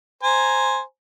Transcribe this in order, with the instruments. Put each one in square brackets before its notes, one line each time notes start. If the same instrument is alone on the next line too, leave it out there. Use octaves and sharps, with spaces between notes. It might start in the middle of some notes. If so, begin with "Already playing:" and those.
[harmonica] C5 G#5 A#5